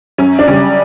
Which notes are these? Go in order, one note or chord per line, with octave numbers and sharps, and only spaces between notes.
F#2 C#4
D4
C#3 G3 C#4